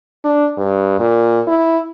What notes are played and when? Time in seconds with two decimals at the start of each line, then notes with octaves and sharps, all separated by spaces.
0.24 D4
0.57 G2
1.00 A#2
1.48 E4